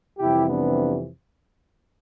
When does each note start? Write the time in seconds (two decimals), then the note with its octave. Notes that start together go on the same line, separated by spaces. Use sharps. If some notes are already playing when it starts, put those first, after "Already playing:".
0.19 F2 C3 E3 G3 E4 G4
0.47 B3 D4